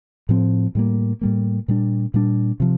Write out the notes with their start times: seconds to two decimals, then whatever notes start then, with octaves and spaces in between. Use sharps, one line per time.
0.29 A2 F3 C4
0.75 A2 G3 A#3
1.21 A2 G3 A#3
1.68 A#2 G3 D4
2.14 A#2 G3 D4
2.60 C3 F3